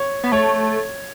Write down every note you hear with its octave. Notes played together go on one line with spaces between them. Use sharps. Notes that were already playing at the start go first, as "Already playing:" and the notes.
Already playing: C#5
B3
A3 C#5